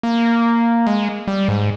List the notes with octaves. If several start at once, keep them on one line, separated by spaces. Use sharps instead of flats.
A#3
G#3
G3
G#2